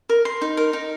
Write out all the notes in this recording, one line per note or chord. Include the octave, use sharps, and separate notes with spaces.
A#4
C6
D#4
A#4
D#4